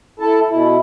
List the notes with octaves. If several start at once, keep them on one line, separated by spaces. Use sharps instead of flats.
E4 A4 A5
B2 E4